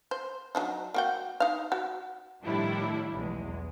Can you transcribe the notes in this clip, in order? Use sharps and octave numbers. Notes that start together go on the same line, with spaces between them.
C5
F#3 D4 D#4
A#3 F#4 G5
D#4 F5
F#4
A2 D#3 F3 G3 D4 E4
B1 E2 G#3